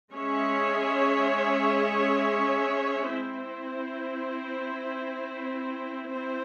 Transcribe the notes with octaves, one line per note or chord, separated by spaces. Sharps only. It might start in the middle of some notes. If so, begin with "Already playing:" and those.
G#3 C#4 G#4 C#5 E5
C4 E4 C5
C4 E4 C5